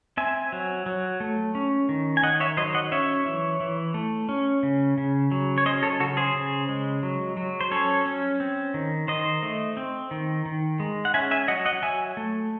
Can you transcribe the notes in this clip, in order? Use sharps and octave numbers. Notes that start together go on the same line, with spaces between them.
C4 E5 G#5
F#3
F#3
A3
C#4
D#3
G#5
D#3 D#5 F#5
C#5 E5
F#3 C5 D#5
D#5 F#5
C#4 C#5 E5
E3
E3
A3
C#4
C#3
C#3
F#3
C#5
C#4 C5 D#5
A4 C#5
C#3 F#4 A4
G#4 C5
C#3
G#3
F#3
F#3
C5
C#4 A4 C#5
C#4
C4
D#3
D#3 C5 D#5
A3
C4
D#3
D#3
G#3
F#5
C#4 E5 G#5
E5 G#5
F#3 D#5 F#5
D#5 F#5
F#3 E5 G#5
A3